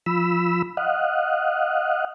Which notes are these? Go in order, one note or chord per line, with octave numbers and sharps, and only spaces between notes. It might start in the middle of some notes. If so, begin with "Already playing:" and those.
F3 B5 E6
D#5 F5 F#5